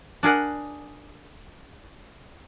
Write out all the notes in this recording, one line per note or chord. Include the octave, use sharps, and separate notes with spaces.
D4 G#4 A#4 F#5